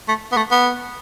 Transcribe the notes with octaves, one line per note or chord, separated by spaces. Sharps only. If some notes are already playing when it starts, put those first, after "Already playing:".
A3
B3
A3
B3